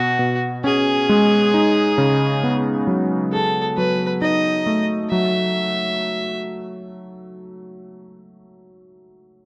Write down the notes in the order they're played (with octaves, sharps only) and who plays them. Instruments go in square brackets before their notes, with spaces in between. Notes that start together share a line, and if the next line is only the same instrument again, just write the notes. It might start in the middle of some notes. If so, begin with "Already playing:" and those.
Already playing: [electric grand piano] B2 [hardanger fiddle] F#4
[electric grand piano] B2
[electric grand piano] C#4 [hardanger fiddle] G#4
[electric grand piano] G#3
D#4
C#3
B3
F#3
[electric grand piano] G#4 [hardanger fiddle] A4
[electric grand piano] F#3 [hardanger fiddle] B4
[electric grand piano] D#4 [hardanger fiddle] D#5
[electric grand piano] A3
[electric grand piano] F#3 [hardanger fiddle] E5